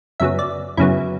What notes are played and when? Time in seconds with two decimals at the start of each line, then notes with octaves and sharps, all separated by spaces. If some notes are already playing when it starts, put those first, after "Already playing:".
0.20 F#2 C#3 F#3 B3 E5
0.39 D5
0.77 F#2 C#3 F#3 B3 E4